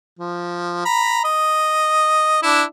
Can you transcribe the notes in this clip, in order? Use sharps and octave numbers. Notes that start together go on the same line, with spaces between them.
F3
A#5 B5
D#5
D4 E4